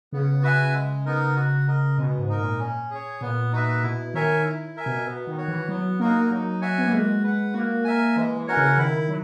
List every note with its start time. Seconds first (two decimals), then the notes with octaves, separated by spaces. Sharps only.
0.12 C#3 B3
0.43 F#4 B4 E5 G#5
0.74 G#3
1.06 B3 D#4 A#4
1.36 F#4
1.67 A#4 D#5
1.98 B2 G#3
2.18 G#2
2.29 D#4 A#4
2.39 A#2
2.60 C#4
2.91 G#4 C#5
3.21 A#2 B3
3.52 D#4 F#4 B4 E5
3.83 B2 E4
4.14 D#3 A#4 C#5 E5 G#5
4.46 E4
4.76 A#4 E5 G#5
4.86 B2
5.06 B2 B3
5.27 D#3
5.38 F#4 C#5
5.48 E3
5.69 F#3 B3
6.00 A#3 D#4 F#4 A#4
6.30 F#3 D#4
6.61 F#4 C#5 E5 G#5
6.78 B3
6.85 A#3
6.92 G#3 F#4
7.24 B4 F#5
7.54 A#3 F#4
7.85 A#4 E5 G#5
8.16 E3 G#3
8.37 E3
8.48 C#4 F#4 A#4 C#5
8.57 C#3
8.78 D#3 E4
9.09 F#3